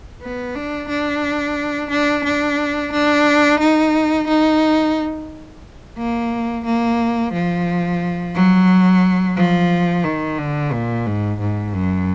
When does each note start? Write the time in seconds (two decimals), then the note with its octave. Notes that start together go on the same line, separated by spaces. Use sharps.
0.21 B3
0.55 D4
0.89 D4
1.90 D4
2.24 D4
2.92 D4
3.60 D#4
4.28 D#4
5.98 A#3
6.65 A#3
7.33 F3
8.35 F#3
9.36 F3
10.04 D#3
10.38 D3
10.72 A#2
11.06 G#2
11.40 G#2
11.74 F#2